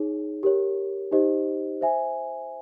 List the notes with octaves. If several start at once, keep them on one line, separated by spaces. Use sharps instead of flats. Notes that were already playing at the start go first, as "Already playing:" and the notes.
Already playing: D#4 G#4 C#5
G4 A#4 C#5
D#4 G4 C5 D#5
C5 E5 G#5